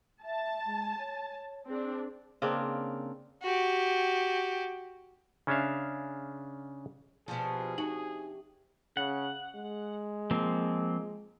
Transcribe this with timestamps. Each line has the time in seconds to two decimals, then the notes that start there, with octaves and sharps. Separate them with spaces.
0.24 E5 A5
0.65 G#3
0.98 C#5
1.68 C4 D4 G#4
2.42 C#3 A#3 C4 D4
3.42 F#4 G4
5.47 C#3 C#4 D4 E5 F5
7.28 B2 F3 D4 G4 G#4 D6
7.78 C3 D#4 F#4 F#7
8.97 C#3 F#5
9.55 G#3
10.31 F3 A#3 C4